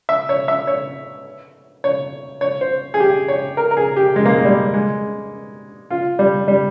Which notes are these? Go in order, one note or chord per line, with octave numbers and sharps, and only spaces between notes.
E5
C#5
E5
C#5
C#5
C#5
C5
G#4
G4
C#5
A#4
A#4
G#4
G4
G#3
A#3
G#3
G3
G#3
F4
G3
G3